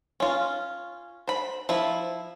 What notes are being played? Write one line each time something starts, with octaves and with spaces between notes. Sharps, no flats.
C#4 F4
C5 B5
F3 E4